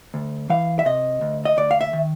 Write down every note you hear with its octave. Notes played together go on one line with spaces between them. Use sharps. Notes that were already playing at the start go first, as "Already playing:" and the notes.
D2
E3 F5
E5
C3 D#5
D2
D#5
D2 D5
F5
E5
D#3